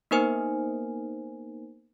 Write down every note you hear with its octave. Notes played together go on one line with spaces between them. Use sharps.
A#3 B3 D#4 A#4 C5 G#5